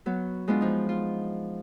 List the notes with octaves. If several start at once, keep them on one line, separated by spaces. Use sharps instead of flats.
F#3 B3
G#3 B3 D4 F4
F3 D#4
F4